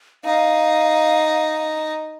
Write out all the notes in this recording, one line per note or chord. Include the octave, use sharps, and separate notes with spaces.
D#4 F5